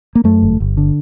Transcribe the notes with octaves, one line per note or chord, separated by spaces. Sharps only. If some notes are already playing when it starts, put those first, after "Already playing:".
A#3
F#2 A3
G1
G1
D3